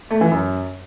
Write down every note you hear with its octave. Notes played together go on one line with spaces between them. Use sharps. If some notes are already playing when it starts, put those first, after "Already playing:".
A3
E3
F#2